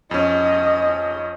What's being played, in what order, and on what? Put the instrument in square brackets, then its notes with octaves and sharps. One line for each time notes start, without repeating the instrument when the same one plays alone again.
[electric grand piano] F2 C#4 [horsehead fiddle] D#5